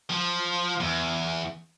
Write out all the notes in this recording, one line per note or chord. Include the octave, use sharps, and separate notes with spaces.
F3
E2